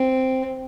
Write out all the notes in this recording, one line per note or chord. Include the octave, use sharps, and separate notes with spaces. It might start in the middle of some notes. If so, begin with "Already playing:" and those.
Already playing: C4